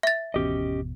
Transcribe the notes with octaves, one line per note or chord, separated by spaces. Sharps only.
E5 A6
G#1 E2 B2 C#4 G4 D#5